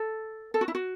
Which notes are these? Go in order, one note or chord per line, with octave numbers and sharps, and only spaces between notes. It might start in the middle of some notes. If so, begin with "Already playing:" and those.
Already playing: A4
A4
F#4
E4
F#4